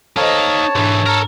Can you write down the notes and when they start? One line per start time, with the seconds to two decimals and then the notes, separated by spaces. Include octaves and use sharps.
0.17 D#4 A4 C5 C#5 D#5 F5 A5
0.75 B1 G#2 E3 D4
1.06 A4 A#4 A#5 F6